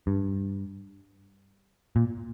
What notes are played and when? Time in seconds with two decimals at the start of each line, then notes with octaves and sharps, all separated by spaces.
0.07 G2
1.96 A#2